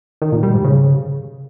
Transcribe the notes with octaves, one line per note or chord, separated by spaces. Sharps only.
D#3
A#2
G3
G#2
C#3